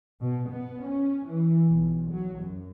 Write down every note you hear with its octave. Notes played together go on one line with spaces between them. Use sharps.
B2
B3
C#4
E3
B1
F#3
F#2